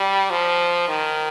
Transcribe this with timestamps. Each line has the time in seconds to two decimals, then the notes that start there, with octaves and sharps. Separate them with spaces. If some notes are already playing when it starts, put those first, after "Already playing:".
Already playing: G3
0.30 F3
0.88 D#3